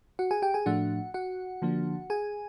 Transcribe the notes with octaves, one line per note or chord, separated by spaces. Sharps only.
F#4 F#5
G#4 G#5
G4 G5
G#4 G#5
A2 F3 A3 D4 F#4 F#5
F#4 F#5
D3 F3 A#3 D4
G#4 G#5